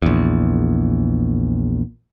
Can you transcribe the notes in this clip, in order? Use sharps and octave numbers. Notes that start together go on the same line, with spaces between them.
A#1 E2